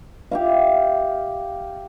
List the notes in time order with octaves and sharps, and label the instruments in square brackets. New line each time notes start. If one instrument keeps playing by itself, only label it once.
[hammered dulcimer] G4 E5 F5